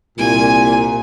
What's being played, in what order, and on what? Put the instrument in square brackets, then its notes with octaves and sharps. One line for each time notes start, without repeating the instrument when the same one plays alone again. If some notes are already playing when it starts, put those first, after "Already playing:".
[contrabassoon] C2 [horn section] A#2 [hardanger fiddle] G#5